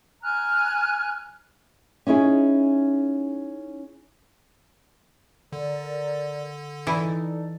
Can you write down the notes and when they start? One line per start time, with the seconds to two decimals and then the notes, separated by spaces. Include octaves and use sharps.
0.23 G#5 A#5 F6 F#6
2.07 C#4 D#4 E4 G#4
5.52 D3 A#4 D5
6.87 E3 D#4 E4 A4 D5